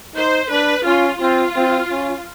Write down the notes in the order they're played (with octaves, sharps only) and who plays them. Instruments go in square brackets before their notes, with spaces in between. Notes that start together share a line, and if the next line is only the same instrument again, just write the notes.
[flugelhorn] D#4 [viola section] C5
[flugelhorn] D4 [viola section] B4
[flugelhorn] C#4 [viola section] F4
[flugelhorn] C4 [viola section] F4
[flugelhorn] C4
C#4